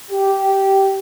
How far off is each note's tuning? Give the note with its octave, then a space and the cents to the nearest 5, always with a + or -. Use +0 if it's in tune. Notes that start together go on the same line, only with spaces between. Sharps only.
G4 -10